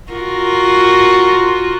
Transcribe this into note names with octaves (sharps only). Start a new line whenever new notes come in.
F4 F#4 A#4